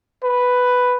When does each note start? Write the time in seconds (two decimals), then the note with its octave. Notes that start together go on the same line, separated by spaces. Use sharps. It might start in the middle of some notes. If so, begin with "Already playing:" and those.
0.23 B4